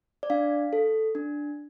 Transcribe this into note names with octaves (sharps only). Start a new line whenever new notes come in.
D5
D4 F5
A4
D4